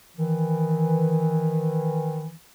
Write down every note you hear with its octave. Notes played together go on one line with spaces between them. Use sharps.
D#3 E3